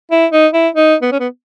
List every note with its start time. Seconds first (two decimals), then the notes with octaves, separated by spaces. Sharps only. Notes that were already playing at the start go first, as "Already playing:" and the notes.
0.11 E4
0.32 D#4
0.53 E4
0.75 D#4
1.02 B3
1.12 C#4
1.20 B3